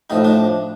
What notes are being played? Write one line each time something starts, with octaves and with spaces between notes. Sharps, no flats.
A2 F3 D#4
D4